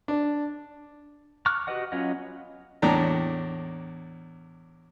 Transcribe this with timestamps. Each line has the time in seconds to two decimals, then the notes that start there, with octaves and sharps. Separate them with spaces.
0.08 D4
1.46 C#6 D6 F6 F#6
1.67 F#4 G4 B4 D#5 F#5
1.92 F#3 B3 C#4 F4 D#5
2.82 E2 A2 D4 G5 A#5